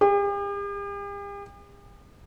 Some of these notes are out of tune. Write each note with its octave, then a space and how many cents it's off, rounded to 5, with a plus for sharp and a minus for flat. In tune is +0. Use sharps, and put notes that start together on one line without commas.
G4 +45